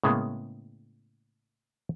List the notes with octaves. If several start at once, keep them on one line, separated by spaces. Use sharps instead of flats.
A2 C#3 G#3 A#3 B3